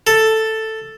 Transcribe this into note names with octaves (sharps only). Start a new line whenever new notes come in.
A4